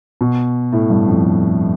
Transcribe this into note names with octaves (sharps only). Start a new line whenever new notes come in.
B2
A2
G2
F2